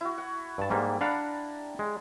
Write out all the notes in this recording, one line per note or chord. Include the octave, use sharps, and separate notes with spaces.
E4 F#4
F#5
G2 A5
G#2 G3 A#3 G4
D4 D5 F5 F#5 A#5 B5
G#3